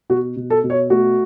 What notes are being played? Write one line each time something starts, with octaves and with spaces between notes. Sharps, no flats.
B2 F#4
B2
A4
B2
C#5
A3 F#4